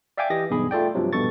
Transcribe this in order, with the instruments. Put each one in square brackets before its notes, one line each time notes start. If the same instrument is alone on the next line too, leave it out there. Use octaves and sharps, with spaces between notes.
[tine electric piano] D5 E5 F5 G5 G#5 D6
E3 G4 D#5 A#6
B1 E2 G2 G#4 B5
A3 F4 A4 D5 G5
G2 C3 F3 F#3
A#1 G2 B2 A4 C#6 A6